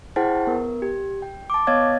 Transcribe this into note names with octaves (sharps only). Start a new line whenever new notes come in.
E4 G#4 C5 F#5 G5 A5
B3 A#4
G4
G5
A5 D6
B3 C#5 D#5 F5 G#6 A6